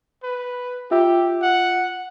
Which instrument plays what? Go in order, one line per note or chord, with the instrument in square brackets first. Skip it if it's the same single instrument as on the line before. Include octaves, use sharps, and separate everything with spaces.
[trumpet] B4
[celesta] F4 E5 E6 [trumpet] G4
[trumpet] F#5